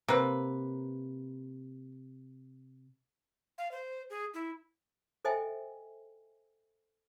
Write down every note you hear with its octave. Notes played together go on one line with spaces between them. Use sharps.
C3 A#3 B4
F5
C5
G#4
E4
A4 C5 D#5 E5 G5 G#5